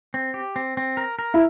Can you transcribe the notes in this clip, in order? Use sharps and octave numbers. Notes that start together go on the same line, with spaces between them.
C4
G4
C4
C4
A#4
A#4
E4